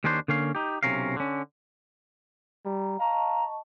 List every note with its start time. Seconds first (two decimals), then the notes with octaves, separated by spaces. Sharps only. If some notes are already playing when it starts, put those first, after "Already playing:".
0.04 D#2 D#3 C#4 D4 C5
0.28 D3 A#3 C#4 F5
0.55 D#4 G4
0.83 B1 C3 C#4 A#4 F5
1.16 D3 C#4
2.65 G3 A#5
2.99 D#5 F5 A5 A#5 C#6